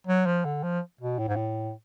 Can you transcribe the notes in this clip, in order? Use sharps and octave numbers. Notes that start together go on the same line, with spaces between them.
F#3
F3
D3
F3
B2
A2
G#2
A2